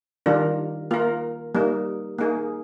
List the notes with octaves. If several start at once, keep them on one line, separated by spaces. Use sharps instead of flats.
D#3 G3 D4 F4 A#4
A#3 F4 A#4
G3 A#3 D#4
A#3 D#4 G#4